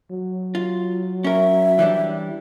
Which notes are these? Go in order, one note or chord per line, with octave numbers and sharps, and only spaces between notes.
F#3
F4
C#4 A#4 E5
E3 G3 D4